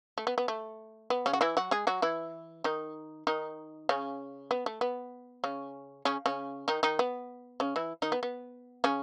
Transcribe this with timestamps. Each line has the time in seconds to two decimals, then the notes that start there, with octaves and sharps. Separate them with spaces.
0.18 A3
0.27 B3
0.38 B3
0.48 A3
1.10 B3
1.26 C#3 C#4
1.33 F#4
1.41 E3 E4
1.57 F#3 F#4
1.71 G#3 G#4
1.87 F#3 F#4
2.02 E3 E4
2.64 D#3 D#4
3.27 D#3 D#4
3.89 C#3 C#4
4.51 B3
4.66 A3
4.81 B3
5.44 C#3 C#4
6.05 C#3 C#4
6.26 C#3 C#4
6.68 D#3 D#4
6.83 D#3 D#4
6.99 B3
7.60 C#3 C#4
7.76 E3 E4
8.02 D#3 D#4
8.12 B3
8.23 B3
8.84 C#3 C#4